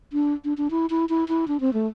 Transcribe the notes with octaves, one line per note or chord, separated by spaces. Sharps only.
D4
D4
D4
E4
E4
E4
E4
D4
C4
A3